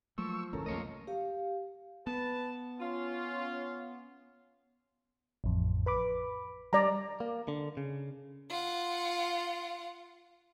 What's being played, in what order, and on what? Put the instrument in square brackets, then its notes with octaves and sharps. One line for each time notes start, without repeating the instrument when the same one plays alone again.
[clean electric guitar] F3 [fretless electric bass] F#3 A3 A#3 [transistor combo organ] C#6 E6
[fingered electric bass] G#1 C#2 F#2 [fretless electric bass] E3 [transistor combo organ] C#4 A4 A#4
[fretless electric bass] C2 F2 [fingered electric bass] A3 A#3 [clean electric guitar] F4 C#5 D#5
[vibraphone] G4 F5
[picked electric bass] B3 [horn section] B4 A5
[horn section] C#4 F4
[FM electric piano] A1 F2
B4 B5 D6
[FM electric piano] G3 [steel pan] D5 A#5
[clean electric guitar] A#3
D3
C#3
[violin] F4 F#5